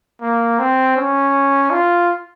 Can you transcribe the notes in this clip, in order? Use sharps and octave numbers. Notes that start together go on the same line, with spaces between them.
A#3
C4
C#4
F4